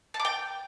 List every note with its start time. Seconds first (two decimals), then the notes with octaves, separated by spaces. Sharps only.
0.14 A5
0.19 D6
0.25 G5